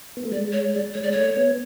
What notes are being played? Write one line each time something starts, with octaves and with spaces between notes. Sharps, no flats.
B3
A3
G#3 D5
C#5
D5
G#3 C#5
D5
A3 C#5
B3